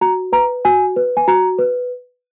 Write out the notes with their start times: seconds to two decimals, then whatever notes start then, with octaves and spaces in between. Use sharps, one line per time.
0.01 F#4 A#5
0.32 B4 A#5
0.65 F#4 G#5
0.96 B4
1.17 G#5
1.28 F#4 A#5
1.59 B4